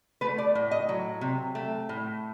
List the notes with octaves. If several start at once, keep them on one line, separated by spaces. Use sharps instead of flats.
A3 B4
D5
A2
D#5
F#3
C3
A3
A2